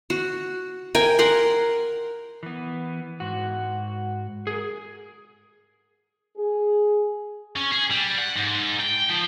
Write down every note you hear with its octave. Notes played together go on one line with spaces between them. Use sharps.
F#4
A#4 G5 G#5
A#4 F#5 C6
E3 B3
G#2 F#4
G#4 A#4
G#4
C#4
G#4
G3
F#5
G#2
G5
F3